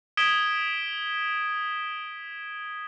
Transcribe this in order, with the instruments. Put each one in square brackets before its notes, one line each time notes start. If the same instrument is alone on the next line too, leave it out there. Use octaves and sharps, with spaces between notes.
[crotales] D#6 G#6 B6 D7 E7 G7